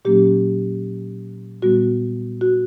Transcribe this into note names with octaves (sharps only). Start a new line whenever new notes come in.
A#2 F#3 A#3 C#4 G4
A#2 G3 B3 F#4
F#4